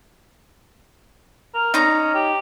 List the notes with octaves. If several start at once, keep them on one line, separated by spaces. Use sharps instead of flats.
A#4
C#4 D#4 A#5
G4